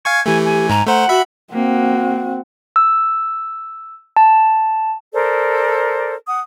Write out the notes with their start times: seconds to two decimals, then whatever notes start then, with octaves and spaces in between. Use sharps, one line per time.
0.05 F5 G#5 C#6 G#6
0.26 E3 A3 G4 G#5
0.45 G#5
0.70 G#2 A#5
0.87 A3 C5 F#5 A#5
1.09 F#4 E5 B5
1.53 A#3 C4 F#4
2.76 E6
4.16 A5
5.13 A4 A#4 C5 D5
6.28 F#5 D#6